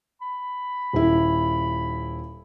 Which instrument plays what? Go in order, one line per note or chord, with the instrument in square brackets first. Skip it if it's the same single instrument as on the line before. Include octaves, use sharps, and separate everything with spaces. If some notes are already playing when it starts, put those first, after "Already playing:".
[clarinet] B5
[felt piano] D#1 E4